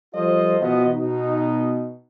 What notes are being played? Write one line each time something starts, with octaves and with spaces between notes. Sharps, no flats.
F3 G3 F4 A4 C5 D#5
B2 E3 F3 B3 F#4 D#5
B2 D#4